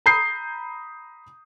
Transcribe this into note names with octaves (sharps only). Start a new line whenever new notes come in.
A#5 B5 D#6 G6 C7